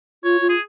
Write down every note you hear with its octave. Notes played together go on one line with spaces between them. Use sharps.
F4 C#5
F4
G#4